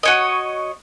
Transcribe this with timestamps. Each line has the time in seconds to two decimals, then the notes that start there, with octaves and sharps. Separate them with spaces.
0.03 F#4 C#5 D#5